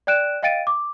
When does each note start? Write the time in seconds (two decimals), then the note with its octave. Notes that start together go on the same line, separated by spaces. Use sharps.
0.07 D5 G5 F#6 D7 E7
0.43 D#5 F5 G5 A6 D7 D#7
0.67 D6